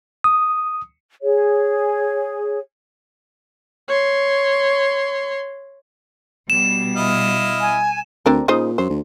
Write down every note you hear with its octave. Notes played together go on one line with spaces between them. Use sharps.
D#6
G#4 C#5
C#5 C6
B2 G3 E7
E4 D#5 F5
G#5
D2 C4 D4 A#4
A#2 C#3 D#4 C5
F#2 C5
D2